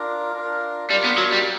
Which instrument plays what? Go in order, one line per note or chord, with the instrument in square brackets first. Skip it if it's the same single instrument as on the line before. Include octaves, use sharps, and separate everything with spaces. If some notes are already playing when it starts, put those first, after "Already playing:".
Already playing: [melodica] D4 F4 A#4
D4 F4 A#4
[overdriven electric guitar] G3 [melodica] D4 F4 A#4
[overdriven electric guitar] B3
F#3
G3